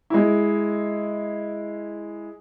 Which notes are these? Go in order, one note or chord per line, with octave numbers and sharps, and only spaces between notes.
G#3 E4